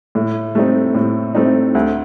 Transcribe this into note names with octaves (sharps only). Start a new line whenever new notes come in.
A2
A3 C4 D#4
A2
A3 C4 D#4
D2